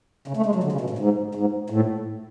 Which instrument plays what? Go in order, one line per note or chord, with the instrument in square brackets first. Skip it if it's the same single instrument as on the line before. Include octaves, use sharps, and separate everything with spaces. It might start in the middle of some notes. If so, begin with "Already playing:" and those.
[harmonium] C#3
A3
G#3
F#3
D3
C#3
B2
A2
G#2
G#2
A2